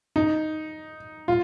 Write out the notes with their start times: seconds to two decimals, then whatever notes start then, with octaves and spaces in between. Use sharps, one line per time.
0.16 D#4
1.28 F4